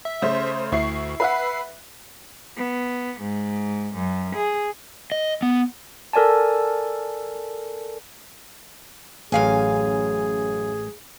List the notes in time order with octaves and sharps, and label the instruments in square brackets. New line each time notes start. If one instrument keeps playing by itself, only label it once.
[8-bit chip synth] E5
[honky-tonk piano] C#3 A3 C5
[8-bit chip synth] D2 [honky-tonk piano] E4 C#6 C7
[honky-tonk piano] B4 E5 F#5 [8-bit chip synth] C7
[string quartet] B3
G#2
F#2
G#4
[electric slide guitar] D#5
B3
[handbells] A4 A#4 D5 G#5 A5
[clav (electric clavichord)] A1 [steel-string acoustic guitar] F#2 F5 G#5 [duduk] G#4